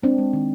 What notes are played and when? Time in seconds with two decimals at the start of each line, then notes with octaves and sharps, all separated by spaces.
0.02 G#3 C4 D4
0.18 G#3
0.33 D#3